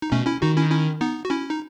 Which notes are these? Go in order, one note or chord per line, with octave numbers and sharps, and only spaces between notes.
D#4
B2 A3 C#4
C#4 E4
D#3 D#4 F#4
C#4 E4
C#4 E4
B3 D#4
F#4
C#4 E4
D#4